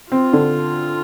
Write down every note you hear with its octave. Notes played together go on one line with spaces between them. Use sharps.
C4 F4
D3